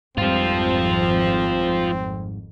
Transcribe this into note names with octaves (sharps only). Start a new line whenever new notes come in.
G#1 F2 G#2 F3 G3 C4 F4